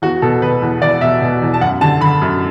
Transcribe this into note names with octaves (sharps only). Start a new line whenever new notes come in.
E2 F#4
B2 A4
B2 B4
E2
E2 D5
B2 E5
B2
E2
A5
F#2 F#5
D3 A5
D3 B5
F#2